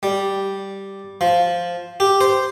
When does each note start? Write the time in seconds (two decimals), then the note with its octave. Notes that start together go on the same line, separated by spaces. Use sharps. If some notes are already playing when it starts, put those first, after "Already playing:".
0.03 G3
1.21 F3
2.00 G4
2.21 C5